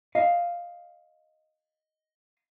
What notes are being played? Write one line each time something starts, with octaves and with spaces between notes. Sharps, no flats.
D#5 F5